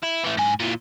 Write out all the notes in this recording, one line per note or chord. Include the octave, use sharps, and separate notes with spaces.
E4
E3 A3
G#2 G#5
A#2 E3